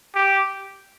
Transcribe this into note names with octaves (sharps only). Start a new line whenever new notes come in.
G4